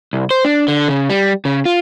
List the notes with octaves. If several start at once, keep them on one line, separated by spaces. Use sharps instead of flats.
C2
C5
D4
D3
C#3
G3
C#3
F4